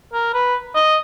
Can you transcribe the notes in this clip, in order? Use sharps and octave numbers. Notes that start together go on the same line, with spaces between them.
A#4
B4
D#5